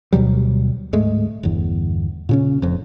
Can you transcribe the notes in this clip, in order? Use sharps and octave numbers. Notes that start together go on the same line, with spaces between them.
D2 B2 F#3 G3
D1 G#2 G#3 A3
G1 E2
A#2 C#3 C#4
F1 F2